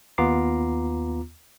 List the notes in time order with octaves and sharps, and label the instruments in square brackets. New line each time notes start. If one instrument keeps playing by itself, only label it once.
[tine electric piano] D#2 B3 F4 A#5 D6 C7